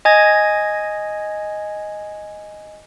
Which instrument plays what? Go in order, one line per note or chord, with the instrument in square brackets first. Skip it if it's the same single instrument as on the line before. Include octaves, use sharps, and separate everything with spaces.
[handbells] D#5 G#5 G#6 A#6